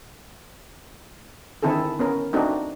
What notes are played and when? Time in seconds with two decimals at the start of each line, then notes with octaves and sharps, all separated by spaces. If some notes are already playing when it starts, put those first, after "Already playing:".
1.63 D3 D#3 C4 E4 G#4 A4
1.99 B3 C#4 A#4
2.33 A3 C4 D4 D#4 F#4